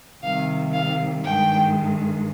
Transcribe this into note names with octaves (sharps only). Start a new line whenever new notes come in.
C3 D#3 G3 F5
F5
G2 D#3 G#3 G5